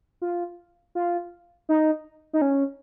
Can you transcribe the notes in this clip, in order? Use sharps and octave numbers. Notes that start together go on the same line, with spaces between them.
F4
F4
D#4
D#4
C#4